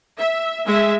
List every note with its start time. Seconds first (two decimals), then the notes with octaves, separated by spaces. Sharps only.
0.18 E5
0.66 G#3 E5